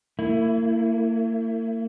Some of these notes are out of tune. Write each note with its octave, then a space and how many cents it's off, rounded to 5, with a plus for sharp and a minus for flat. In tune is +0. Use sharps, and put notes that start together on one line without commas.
A#3 -40 E4 +20